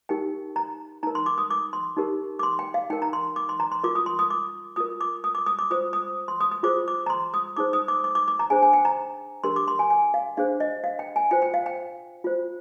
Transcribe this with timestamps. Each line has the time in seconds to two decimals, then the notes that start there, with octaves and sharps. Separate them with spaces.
0.09 D#4 G4 A#4 G5
0.56 A#5
1.03 D#4 A#4 A#5
1.15 C6
1.26 D6
1.38 D#6
1.51 D6
1.73 C6
1.97 D#4 G4 A#4
2.39 D6
2.43 C6
2.59 G5
2.74 F5
2.90 D#4 G5
2.93 A#4
3.02 A#5
3.13 C6
3.36 D6
3.49 C6
3.60 A#5
3.72 C6
3.83 F4 A#4 D6
3.95 D#6
4.06 C6
4.19 D#6
4.31 D6
4.76 F4 A#4 D#6
5.01 D6
5.24 D#6
5.35 D6
5.46 D#6
5.59 D6
5.71 F4 C5 D#6
5.93 D#6
6.28 C6
6.41 D#6
6.51 D#6
6.63 F4 G#4 C5 D6
6.88 D6
7.06 A#5
7.10 C6
7.34 D#6
7.57 D#4 G#4 C5 D6
7.73 D#6
7.88 D6
8.04 D6
8.15 D6
8.28 D6
8.39 A#5
8.50 D4 G#4 C5 G#5
8.62 G#5
8.73 G5
8.85 A#5
9.44 D4 G4 A#4 C6
9.56 D6
9.68 C6
9.79 G#5
9.90 G#5
10.14 F5
10.37 D4 G#4 C5 F5
10.60 D#5
10.84 F5
10.99 G5
11.16 G#5
11.31 F4 C5 G5
11.42 G5
11.54 F5
11.66 G5
12.24 F4 C5